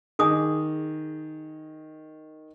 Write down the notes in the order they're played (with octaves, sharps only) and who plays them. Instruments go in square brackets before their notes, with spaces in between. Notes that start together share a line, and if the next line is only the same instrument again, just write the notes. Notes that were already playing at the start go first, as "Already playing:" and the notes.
[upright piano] D#3 D#5 G#5 [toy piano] G#4 D#6